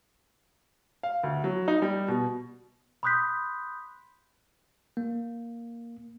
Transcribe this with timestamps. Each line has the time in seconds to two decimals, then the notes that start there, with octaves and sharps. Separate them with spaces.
1.03 F5
1.23 D2
1.44 F#3
1.68 D#4
1.82 G3
2.08 B2
3.03 B5 C6 D#6 F#6 G6 B6
4.97 A#3